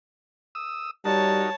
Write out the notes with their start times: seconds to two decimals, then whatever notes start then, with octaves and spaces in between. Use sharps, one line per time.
0.55 D#6 E6
1.05 G3 D#4 F#4 A#4 C#5 A5